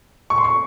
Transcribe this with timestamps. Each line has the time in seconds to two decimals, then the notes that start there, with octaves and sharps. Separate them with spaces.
0.30 C#6
0.38 C6
0.44 C#6